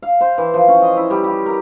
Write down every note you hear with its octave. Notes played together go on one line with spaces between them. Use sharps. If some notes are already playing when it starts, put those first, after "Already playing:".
F5
C5
E3
F3
C#4
D#5
E4
G3
G4
A#4